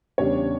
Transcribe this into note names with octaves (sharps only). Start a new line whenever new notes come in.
E2 C#3 G3 D4 C#5